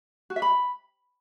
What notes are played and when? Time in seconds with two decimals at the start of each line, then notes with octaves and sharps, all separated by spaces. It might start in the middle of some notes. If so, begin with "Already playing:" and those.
0.30 F#4
0.36 E5
0.42 B5